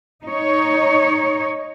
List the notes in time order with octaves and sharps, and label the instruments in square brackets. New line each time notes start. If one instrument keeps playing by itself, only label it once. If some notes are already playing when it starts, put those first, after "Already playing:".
[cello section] D#4 C#5